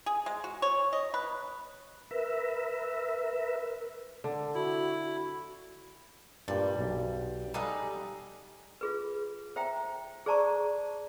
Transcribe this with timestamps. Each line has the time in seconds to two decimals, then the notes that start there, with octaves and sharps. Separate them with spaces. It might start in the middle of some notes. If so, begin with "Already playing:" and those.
0.06 G#4
0.26 G#3
0.44 F#4
0.62 C#5
0.93 D#5
1.14 B4
2.11 A#4 B4 E5
4.24 D3
4.55 E4 F#4
5.05 F#4
6.48 G2 A#2 G3
6.79 B1
7.54 G3 D#4 G#4 A4 B4 F5
8.81 F4 G#4 B4
9.56 C5 E5 G5 A#5
10.26 G#4 C5 D5 A5 A#5 C#6